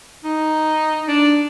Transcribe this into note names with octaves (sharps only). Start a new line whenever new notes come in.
D#4
D4